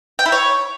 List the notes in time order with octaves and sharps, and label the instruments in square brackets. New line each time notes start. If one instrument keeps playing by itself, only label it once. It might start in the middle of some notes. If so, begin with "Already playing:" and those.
[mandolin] G5
E4
C#5